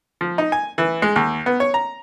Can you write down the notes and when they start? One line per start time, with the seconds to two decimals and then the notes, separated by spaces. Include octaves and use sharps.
0.21 F3
0.38 D#4
0.52 G#5
0.78 E3
1.02 G#3
1.16 D#2
1.46 B3
1.60 C#5
1.74 A#5